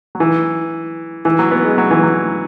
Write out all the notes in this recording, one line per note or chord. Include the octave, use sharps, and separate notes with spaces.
F#3
E3
E3
F#3
B3
G#3
F#3
E3
F#3